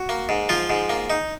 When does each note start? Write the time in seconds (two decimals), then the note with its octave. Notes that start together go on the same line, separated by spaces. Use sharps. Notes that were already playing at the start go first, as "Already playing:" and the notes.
Already playing: F#4
0.09 A#3
0.29 G#2
0.49 F3 F4
0.70 G#2
0.90 A#3
1.10 D#4